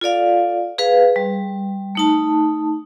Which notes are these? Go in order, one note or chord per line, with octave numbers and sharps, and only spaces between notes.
F4 A4 D5 F5
G#4 B4 F5
G3
A3 D#4 A5